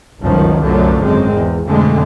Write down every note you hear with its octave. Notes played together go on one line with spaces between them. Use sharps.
G1 C#2 F#2 D#3 F3
C2 F#2 D3 F3 F#3 A3
G#1 F#2 G#3 C4
E2
F2 B2 D3 G#3 A3